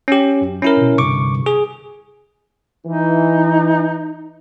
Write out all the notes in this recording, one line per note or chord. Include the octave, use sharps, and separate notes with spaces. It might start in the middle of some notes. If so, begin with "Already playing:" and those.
C#4 G4
F#2
C#4 E4 A#4 B5
G#2 B2
C2 G2 D3 C#6 D6
G#4
E3 D#4